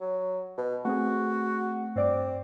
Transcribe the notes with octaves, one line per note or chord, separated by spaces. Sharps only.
F#3
B2
A3 C4 F#4 G#4
G2 C4 D5 D6